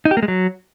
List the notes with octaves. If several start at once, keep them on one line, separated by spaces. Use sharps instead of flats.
D#4
G4
A#3
G#3
F#3